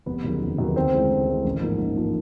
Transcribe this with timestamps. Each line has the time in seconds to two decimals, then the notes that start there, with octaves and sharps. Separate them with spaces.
0.06 F1 B3 B4
0.24 D#2 C#3 F#3
0.42 F1
0.58 D#2 C#3 F#3
0.68 B4
0.76 D2 C4 C5
0.94 C#3 E3 G#3
1.11 D2
1.27 C#3 E3 G#3
1.45 A1
1.61 G#2 F3 A#3
1.80 A1
1.96 G#2 F3 A#3